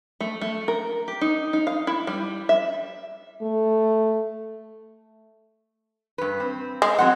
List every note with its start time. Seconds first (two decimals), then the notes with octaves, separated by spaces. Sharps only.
0.20 A3
0.41 A3
0.68 A#4
1.08 G4
1.21 D#4
1.53 D#4
1.67 F5
1.87 E4
2.07 G3
2.49 E5
3.42 A3
6.18 G2 B4
6.40 C4
6.82 G#3
6.99 F#3 C4 F#5